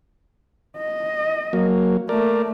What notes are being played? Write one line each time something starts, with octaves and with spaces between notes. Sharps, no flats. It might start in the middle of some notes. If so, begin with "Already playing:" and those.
D#5
F#3 A#3
A3 A#3 A#4 D5